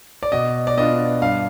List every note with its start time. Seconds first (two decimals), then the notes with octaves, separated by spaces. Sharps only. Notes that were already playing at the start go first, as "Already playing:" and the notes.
0.23 D5
0.32 B2 D#5
0.67 D5
0.77 B3 D4 F4 D#5
1.22 G2 F5